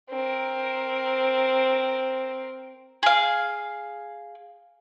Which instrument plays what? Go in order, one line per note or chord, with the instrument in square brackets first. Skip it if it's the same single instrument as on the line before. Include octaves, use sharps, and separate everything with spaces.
[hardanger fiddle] C4 A#4
[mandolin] G#4 F5